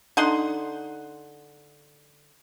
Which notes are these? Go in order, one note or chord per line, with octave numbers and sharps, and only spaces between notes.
D3 D#4 F#5 C6